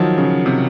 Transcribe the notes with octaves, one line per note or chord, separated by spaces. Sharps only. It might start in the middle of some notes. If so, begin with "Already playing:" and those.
Already playing: D#3 F3 F#3
C#3
C3